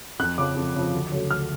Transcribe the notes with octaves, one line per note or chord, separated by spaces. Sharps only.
F2 F#6
C#3 F3 D6
F2
C#3 F3
D2
C#3 F#3 A3 C#4
D2 F6